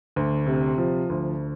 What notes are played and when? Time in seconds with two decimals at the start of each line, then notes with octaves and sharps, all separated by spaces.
0.16 D2
0.46 C3
0.78 F3
1.10 D2